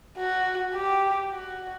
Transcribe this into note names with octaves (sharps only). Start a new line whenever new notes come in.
F#4
G4
F#4